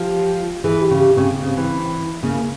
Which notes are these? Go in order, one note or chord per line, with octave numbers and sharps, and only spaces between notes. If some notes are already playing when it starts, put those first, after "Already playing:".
Already playing: F3 G4
E3 G#4
G4
C#3
G4
C#3 C4
C#3
E3
C#3 A#3